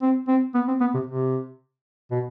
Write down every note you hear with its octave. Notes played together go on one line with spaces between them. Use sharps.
C4
C4
B3
C4
B3
C3
C3
B2